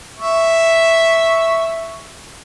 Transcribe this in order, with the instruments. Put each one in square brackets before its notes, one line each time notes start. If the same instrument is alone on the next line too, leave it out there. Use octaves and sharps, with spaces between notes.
[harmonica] E5 C#6